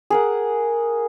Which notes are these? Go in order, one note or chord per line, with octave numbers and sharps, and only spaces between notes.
G#4 A#4 F#5